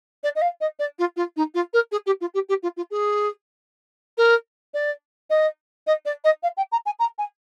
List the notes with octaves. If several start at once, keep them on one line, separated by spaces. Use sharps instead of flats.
D5
D#5
F5
D#5
D5
F4
F4
D#4
F4
A#4
G#4
G4
F4
G4
G4
F4
F4
G#4
A#4
D5
D#5
D#5
D5
D#5
F5
G5
A#5
G#5
A#5
G#5